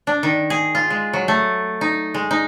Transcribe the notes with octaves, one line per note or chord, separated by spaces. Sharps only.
D4
D#3
G#4
F4
G#3
F#3
A3
D#4
G#3
D#4